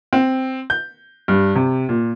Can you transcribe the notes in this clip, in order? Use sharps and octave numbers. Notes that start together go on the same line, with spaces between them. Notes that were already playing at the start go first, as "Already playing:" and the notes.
C4
G6
G2
C3
A#2